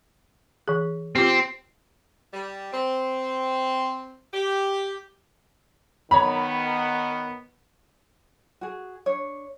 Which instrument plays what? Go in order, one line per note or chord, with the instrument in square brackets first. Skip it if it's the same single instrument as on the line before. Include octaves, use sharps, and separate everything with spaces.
[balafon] E3 G#4
[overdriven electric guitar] C4 [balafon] F4 G4
[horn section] G3
C4
G4
[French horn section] D#3 B3 [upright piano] C#5 A#5 B5
[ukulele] F#4 G#4
D4 C#5